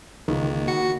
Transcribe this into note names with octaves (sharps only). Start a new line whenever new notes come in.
C#2 D#3 A#3
F#4 C#7